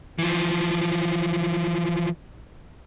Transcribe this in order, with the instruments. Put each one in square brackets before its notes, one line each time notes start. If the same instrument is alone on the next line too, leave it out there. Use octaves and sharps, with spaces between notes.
[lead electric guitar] E3 F3